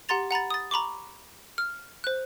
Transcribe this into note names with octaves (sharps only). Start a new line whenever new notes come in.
G4 F#5 A#5 C6 A6 F7
F#5 A#5 B5 A6
D#6 A6
A#5 B5 C#6 D6
F6
C5 F#6